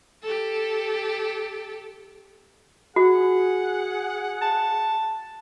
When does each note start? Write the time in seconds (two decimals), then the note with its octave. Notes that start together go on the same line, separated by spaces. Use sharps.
0.23 G4 A4
2.96 F#4 G#4 F#5
4.41 A5